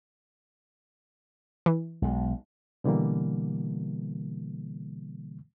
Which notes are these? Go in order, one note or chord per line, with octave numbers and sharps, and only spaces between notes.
E3
B1 G#3
B2 D3 E3 G3 A#3